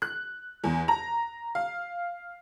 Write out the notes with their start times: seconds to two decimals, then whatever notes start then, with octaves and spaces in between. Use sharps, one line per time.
0.02 F#6
0.64 E2
0.88 A#5
1.55 F5